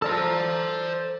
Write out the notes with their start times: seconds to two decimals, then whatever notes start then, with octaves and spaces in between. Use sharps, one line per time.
0.02 A4 C5 D5 A5 A#5